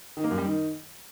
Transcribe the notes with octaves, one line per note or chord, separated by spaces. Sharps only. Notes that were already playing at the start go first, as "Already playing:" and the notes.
D#3
A#3
F#2
G3
D#3